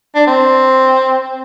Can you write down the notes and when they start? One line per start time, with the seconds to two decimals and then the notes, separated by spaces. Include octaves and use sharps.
0.15 D4
0.27 C4